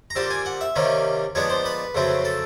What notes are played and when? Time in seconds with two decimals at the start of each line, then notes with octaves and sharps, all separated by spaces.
0.10 A#5
0.15 A#2 G3 C4 A5
0.30 G#5
0.46 F#5
0.61 E5
0.76 C3 D#3 G3 A#3 C#4
1.35 A#2 F3 G#3 B3 D4 C#5
1.50 C5
1.65 B4
1.94 F2 C#3 F#3 A3 C4
2.25 A4